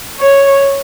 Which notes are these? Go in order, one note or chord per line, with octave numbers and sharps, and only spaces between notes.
C#5